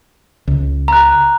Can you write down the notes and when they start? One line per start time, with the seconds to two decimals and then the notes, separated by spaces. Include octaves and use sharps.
0.47 C#2
0.88 A#5 F#6